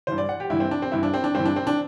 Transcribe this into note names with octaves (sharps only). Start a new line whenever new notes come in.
G2 E3 C5
D5
F#5
G4
G2 E3 E4
C4
D4
C4
G2 E3 E4
D4
C4
D4
G2 E3 C4
D4
C4
D4